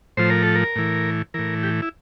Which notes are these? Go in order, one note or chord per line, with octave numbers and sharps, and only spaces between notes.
A2 F3 C5
A#4
A4
A#4
A2 E3
A2 E3 A#4
G4
E4